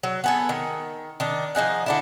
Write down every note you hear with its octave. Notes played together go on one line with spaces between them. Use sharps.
F#3
B3 G#4 A4
D#3
D#3 D4
F3 D#4 G#4 F#5
D3 D4 E4